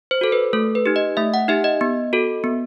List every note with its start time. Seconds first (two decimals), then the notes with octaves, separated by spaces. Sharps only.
0.11 C5
0.21 F#4 A4
0.32 B4
0.53 A3 A4
0.75 B4
0.86 D#4 G4
0.96 D#5
1.17 A3 E5
1.34 F#5
1.48 D#4 G4 E5
1.64 D#5
1.81 B3
2.13 F#4 A4
2.44 B3